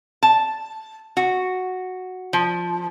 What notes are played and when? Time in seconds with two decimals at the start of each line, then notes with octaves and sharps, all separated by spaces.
0.23 A5
1.17 F#4
2.33 F3